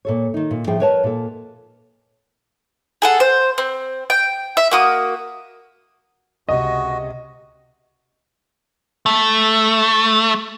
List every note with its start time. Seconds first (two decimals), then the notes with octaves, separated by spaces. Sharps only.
0.05 A#2 A4 C#5
0.34 D#3 D#4
0.51 A#2
0.67 A2 F3 G#4 G5
0.80 A#4 B4 C#5 D#5 A5
1.04 A#2 A4
3.02 G#4 A4 F#5
3.20 C5
3.58 C4
4.10 G5
4.57 E5
4.71 A#3 F#4 D#6
6.49 C#2 C3 F#4 D#5
9.06 A3